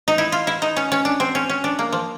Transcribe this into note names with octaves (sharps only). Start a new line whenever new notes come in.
D#4
E4
F4
E4
D#4
C#4
C#4
D4
C4
C#4
C#4
D4
A#3
F3